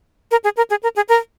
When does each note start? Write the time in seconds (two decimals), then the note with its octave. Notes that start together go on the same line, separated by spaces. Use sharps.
0.31 A#4
0.44 G#4
0.57 A#4
0.70 G#4
0.83 A#4
0.96 G#4
1.09 A#4